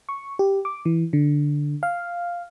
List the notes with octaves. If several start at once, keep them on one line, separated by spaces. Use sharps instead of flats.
C#6
G4
D6
E3
D3
F5